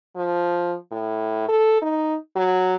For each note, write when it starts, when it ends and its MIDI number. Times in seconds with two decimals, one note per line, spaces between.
0.16 0.75 53
0.92 1.46 45
1.49 1.81 69
1.82 2.16 63
2.36 2.75 54